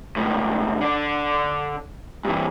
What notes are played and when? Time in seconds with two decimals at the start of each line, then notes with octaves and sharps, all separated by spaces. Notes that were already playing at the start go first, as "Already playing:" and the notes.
0.16 C#2 A2
0.81 D3 D4
2.25 G2 E3